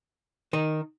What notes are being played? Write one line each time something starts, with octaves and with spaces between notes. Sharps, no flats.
D#3 D#4